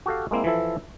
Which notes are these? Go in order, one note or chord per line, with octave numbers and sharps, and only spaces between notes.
F#4 G4 A4 F5
G#3 A#3 C4 E4
E3 F3 E4 A4